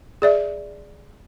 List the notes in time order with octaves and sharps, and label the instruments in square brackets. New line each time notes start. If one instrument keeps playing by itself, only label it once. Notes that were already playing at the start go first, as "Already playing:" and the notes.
[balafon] G#4 D5 E5